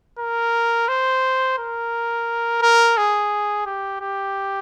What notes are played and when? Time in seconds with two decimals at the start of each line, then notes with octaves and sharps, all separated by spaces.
0.19 A#4
0.88 C5
1.58 A#4
2.62 A#4
2.97 G#4
3.66 G4
4.01 G4